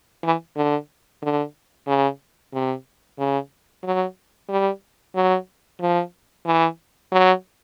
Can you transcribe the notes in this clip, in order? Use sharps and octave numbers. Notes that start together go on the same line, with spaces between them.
E3
D3
D3
C#3
C3
C#3
F#3
G3
F#3
F3
E3
F#3